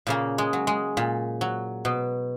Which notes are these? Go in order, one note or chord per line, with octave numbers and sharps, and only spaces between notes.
A#2 C#3 A#3
G#3
F#3
G#3
A#2
F#3
B2